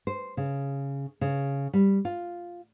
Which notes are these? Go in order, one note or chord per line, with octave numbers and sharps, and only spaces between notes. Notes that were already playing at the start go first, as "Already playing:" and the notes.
C5
C#3
C#3
G3
F4